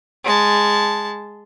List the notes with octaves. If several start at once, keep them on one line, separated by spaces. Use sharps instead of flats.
G#3 A5